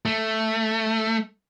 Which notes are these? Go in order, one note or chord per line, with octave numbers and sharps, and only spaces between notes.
A3